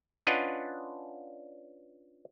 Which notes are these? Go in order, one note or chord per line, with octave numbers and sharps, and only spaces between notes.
C#4 D4 F4 B4 D#5 F#5